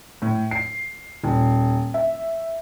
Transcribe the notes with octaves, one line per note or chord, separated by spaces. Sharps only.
A2
C7
D#1
E5